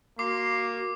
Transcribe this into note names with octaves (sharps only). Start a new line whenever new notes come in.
A#3 F#4 C6 D6 C7